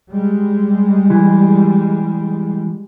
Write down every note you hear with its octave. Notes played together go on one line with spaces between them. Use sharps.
G3 G#3
E3